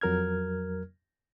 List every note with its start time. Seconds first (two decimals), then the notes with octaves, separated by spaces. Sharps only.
0.01 F2 F#3 A#4 F6 G#6